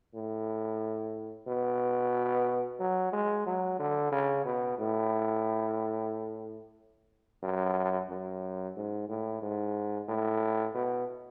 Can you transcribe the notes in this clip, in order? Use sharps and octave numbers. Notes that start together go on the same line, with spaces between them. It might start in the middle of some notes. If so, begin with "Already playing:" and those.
A2
B2
F#3
G#3
F#3
D3
C#3
B2
A2
F#2
F#2
G#2
A2
G#2
A2
B2